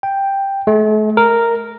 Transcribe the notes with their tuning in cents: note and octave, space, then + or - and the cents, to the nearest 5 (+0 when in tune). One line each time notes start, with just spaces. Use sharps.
G5 +5
A3 -45
A#4 -5